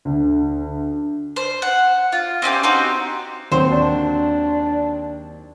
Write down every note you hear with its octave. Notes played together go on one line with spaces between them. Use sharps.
D2
C5
F#5
F4
C4 C#4 E4 G4
C4 D#4 F#4 G4
D#2 F#3 C4 C5
D4